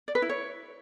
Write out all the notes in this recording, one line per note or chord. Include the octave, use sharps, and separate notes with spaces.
D5
B4
E4
C#5